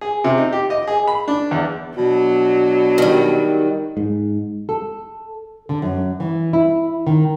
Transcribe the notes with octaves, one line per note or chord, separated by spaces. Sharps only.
G#4
C3
D#4
G4
D#5
G#4
B5
D4
E2
B2 F#3 D4
D#3 G3
G#2
A4
D3
F#2
E3
E4
D#3